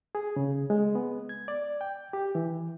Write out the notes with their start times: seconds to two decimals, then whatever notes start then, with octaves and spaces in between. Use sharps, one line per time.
0.15 G#4
0.36 C#3
0.70 G#3
0.95 B3
1.29 G#6
1.48 D5
1.81 G5
2.13 G4
2.35 E3